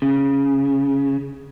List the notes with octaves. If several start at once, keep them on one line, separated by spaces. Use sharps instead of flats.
C#3